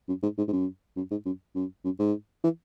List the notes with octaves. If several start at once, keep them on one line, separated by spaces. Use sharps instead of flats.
F#2
G#2
G#2
G#2
F#2
F#2
G#2
F#2
F#2
F#2
G#2
E3